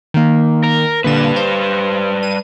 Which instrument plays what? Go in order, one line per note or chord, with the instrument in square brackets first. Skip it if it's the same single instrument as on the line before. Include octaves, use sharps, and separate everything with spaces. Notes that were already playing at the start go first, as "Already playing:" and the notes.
[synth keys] D#3 A#3
[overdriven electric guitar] A#4
[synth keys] A#2 D3 E7 [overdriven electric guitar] G3 B4
[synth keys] C5
D#7